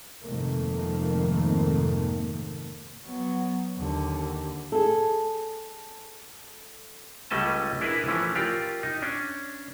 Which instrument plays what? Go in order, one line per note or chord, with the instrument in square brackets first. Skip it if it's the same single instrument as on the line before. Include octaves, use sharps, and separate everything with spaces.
[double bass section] F2 G#2 C3 D#3 A3 A#3
[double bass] F#3 B3
D#2 D3
[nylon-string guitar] G#4 A4
[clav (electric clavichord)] C#2 G3 A3 C#4 D#5 A5
D4 E4 G#4 A#4 B4
E3 F3 A3 C#4
F4 G4 A#4 D5
D#4
C#4 D4